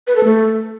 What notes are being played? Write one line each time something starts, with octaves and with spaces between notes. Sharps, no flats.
B4
A4
A3